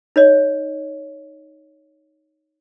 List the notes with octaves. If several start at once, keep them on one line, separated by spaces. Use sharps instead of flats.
D#4 C#5 D#5